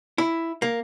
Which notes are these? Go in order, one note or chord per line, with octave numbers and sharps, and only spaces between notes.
E4
A#3